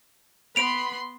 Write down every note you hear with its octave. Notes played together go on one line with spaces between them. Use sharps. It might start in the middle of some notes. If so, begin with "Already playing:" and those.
B3 B5 C6 D7 F7